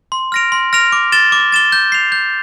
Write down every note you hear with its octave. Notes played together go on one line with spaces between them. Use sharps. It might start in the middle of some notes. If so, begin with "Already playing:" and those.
C6
F6 A#6 D7 F7
C6
F6 A#6 D7 F7
D6
A6 E7 G7
D6
A6 E7 G7
G6
C7 F7
G6